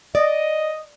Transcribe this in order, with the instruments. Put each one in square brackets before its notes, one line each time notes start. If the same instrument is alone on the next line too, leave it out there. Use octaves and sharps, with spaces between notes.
[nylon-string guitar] D5 [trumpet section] D#5